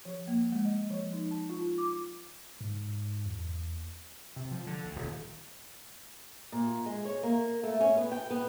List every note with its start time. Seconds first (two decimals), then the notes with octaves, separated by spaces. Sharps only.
0.05 F3
0.28 A#3
0.52 G#3
0.65 D#5
0.91 F3
1.13 D#4
1.31 A5
1.50 F4
1.78 D6
2.61 G#2
3.26 E2
4.36 C3
4.51 F3
4.67 D3
4.84 D2
4.96 D#1
6.52 A#2
6.86 G#3
7.05 C#5
7.23 A#3
7.63 A3
7.80 C#4
7.97 B3
8.12 G5
8.30 B3